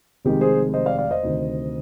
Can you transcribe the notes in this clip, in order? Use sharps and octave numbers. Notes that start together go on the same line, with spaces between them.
F1 F2 D#3 G#3 G4
G#4 C5
C5 D#5
D5 F5
D5 F5
C5 D#5
D2 C3 D#3